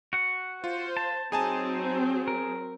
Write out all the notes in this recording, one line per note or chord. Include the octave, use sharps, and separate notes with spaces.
F#4 F#5
F4 C5
A5
F#3 C4 D#4 G#4 G#5 A5
A#4